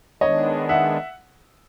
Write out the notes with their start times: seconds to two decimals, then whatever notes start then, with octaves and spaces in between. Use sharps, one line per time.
0.21 D#3 G#3 B3 D4 C#5 D#5
0.69 E5 F#5